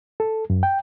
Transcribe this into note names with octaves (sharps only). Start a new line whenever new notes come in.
A4
F#2
G5